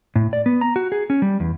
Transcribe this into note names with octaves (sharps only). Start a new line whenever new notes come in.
A2
D5
B3
A#5
F#4
G#4
C#4
G3
E2